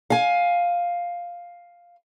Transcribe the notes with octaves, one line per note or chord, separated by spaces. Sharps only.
F5 G#5